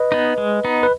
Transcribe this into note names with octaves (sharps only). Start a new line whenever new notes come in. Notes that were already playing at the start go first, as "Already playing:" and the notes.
Already playing: B4 D#5
B3 D#4
G#3
B3 D#4
B4